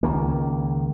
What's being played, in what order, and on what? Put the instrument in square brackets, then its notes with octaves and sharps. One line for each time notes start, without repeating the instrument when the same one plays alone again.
[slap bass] C#2 D#3 A#3